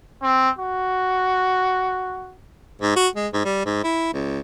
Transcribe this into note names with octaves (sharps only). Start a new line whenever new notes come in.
C4
F#4
G#2
F#4
G#3
G#2
G3
G#2
E4
C#2